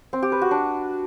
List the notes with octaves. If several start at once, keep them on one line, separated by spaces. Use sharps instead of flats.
C4
G4
B4
F#4
D4